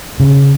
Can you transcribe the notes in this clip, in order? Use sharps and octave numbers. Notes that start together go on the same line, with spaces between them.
C#3